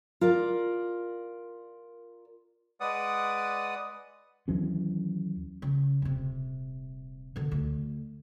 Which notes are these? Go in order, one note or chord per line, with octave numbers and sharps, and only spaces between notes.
F4 A#4 D5
G#3 B4 D5 F#5 D#6
D#2 E3 F#3 C#4
C#3
D#1 C3
B2 D3
D2